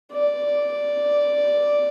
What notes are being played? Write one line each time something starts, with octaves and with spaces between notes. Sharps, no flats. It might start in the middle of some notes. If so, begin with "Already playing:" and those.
D5